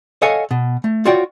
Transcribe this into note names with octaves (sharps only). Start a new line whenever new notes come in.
A4 C#5 D#5 F5 F#5 G#5
B2
A3
F4 F#4 C#5 D5 G5